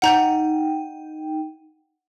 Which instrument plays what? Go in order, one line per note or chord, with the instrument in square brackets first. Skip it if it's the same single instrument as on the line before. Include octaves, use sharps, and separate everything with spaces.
[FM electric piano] D#4 G5 [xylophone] F#5 A#5 G6